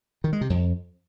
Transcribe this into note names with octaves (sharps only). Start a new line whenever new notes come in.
D#3
G#3
C3
F2